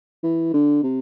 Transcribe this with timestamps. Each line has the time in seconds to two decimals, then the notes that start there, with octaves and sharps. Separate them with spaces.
0.23 E3
0.54 D3
0.83 C3